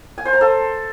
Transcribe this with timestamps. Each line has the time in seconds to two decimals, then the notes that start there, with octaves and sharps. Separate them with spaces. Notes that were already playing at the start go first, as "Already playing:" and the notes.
0.18 G#5
0.25 C5
0.33 A#5
0.41 A4